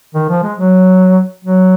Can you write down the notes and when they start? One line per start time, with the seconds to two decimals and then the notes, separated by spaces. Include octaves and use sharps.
0.15 D#3
0.30 F3
0.43 G#3
0.58 F#3
1.45 F#3